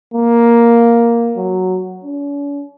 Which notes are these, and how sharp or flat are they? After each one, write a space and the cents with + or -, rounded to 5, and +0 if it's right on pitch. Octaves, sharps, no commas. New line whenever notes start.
A#3 +5
F#3 +0
C#4 +45